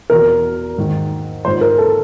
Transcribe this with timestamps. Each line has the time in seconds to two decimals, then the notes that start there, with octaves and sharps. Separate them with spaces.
0.10 E2 B2 A#4
0.78 G#2 D#3
1.45 F3 C5
1.47 G#2
1.61 A#4
1.78 A4